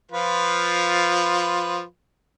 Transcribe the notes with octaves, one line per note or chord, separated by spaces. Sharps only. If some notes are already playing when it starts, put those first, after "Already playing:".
F3 F4 B4